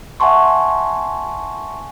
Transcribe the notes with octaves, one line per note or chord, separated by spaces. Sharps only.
E5 F#5 G#5 A5 C6 C#6